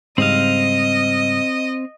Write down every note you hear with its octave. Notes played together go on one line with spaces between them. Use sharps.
G#2 C#3 G3 C4 D#5 F5